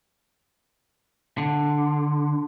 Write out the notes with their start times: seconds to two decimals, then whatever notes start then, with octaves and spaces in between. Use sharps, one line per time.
1.38 D3